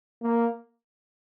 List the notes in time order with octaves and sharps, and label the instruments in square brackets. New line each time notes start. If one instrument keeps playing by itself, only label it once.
[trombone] A#3